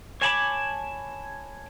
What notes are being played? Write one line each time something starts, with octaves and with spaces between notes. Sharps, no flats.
C#5 G#5 A5 B5 D6